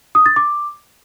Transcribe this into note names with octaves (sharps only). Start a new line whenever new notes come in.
D#6
A6
D6